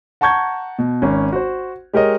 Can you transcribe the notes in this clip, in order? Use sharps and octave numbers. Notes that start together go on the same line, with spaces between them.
F#5 A5 A#5 C#6 G6 G#6
B2
G#1 C#4
F#4 C5
G#3 G4 A#4 C#5 D#5